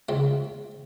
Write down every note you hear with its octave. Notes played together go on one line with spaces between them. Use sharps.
C#2 C4